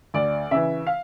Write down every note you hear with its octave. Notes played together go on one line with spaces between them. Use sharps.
D2 D5
C#3 E3 E5
F5